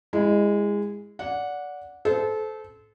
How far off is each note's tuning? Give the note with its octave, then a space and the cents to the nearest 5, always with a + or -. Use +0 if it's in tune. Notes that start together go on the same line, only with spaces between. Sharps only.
G#3 -20 E4 +10
D5 -20 F#5 -15
A4 -25 C5 -25